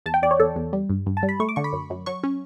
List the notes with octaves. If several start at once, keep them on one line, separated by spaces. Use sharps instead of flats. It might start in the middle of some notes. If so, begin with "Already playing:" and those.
E2 A5
G5
E2 D5
C#5
E2 A4
E2
G3
G2
G2
A5
G3
B5
A3 C#6
D6
D3 C#6
B5
F#2
F#2
F#3 C#6
C#4